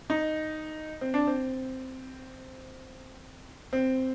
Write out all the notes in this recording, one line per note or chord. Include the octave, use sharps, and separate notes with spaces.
D#4
C4
D4
C4
C4